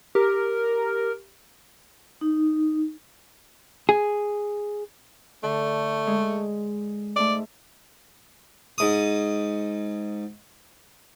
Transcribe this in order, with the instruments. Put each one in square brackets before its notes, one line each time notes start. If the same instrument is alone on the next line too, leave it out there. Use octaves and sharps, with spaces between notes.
[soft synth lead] G4 [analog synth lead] A#4
[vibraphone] D#4
[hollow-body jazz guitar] G#4
[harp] D3 [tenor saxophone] A3
[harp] G#3
[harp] G#2 A3 [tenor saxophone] D5
[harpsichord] G#2 D#6